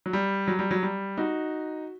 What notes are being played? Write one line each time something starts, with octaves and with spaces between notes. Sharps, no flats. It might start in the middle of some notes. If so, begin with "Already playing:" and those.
F#3
G3
F#3
G3
F#3
G3
D#4 F#4